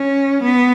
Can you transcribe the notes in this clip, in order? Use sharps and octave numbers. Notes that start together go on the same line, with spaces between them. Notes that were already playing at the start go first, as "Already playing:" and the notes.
Already playing: C#4
B3